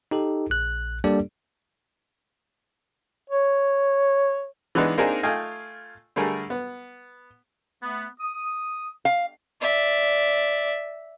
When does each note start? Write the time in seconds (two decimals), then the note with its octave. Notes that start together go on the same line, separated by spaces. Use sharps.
0.11 D#4 G4 A4
0.50 A#1 F#6
1.04 G3 A#3 D4 G4 A4 D5
3.30 C#5
4.75 E3 G#3 B3 D4 D#4
4.98 A#3 C4 D4 D#4 G#4 A#4
5.23 A3 F4 D#5 F5 G5 G#5
6.16 D3 G3 A3 G#4 A#4
6.50 B3
7.82 A3 B3
8.20 D#6
9.05 F5
9.61 D5 E5